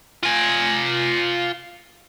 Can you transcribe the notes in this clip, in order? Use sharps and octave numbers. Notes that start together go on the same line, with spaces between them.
F4 G#5